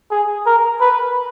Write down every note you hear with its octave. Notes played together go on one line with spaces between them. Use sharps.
G#4
A#4
B4